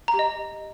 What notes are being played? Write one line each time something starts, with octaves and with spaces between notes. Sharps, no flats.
A#5
G4
D#5